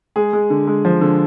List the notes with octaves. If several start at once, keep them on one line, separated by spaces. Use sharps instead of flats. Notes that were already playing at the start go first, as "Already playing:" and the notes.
G#3 G#4
G#3
D3
G#3
F3
D3